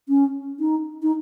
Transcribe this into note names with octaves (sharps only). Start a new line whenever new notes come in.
C#4
D#4
D#4